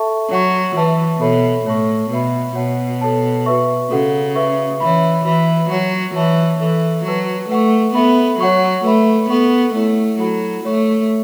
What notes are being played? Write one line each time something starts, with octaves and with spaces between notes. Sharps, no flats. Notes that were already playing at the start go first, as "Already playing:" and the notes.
Already playing: A4 E5 A5 C#6
F#3 C#5 F#5 C#6
E3 B4 E5 A5 C#6
B2 A4 C#5 E5 B5
A2 C#5 A5 C#6
B2 B4 E5 B5
B2 C#5 F#5 A5
A4 C#5 A5
F#4 B4 E5 C#6
C#3 F#4 A4 F#5
B4 E5 C#6
E3 C#5 E5 B5
E3 F#4 B4 E5 B5
F#3 C#5 F#5 C#6
E3 C#5 E5 A5 C#6
E3 A4 E5 C#6
F#3 B4 A5 C#6
A3 B4 F#5 C#6
B3 A4 E5 B5
F#3 C#5 F#5 C#6
A3 B4 E5 B5
B3 A4 F#5 C#6
A3 E4 C#5 F#5
F#3 E4 A4 F#5 B5
A3 C#5 E5 C#6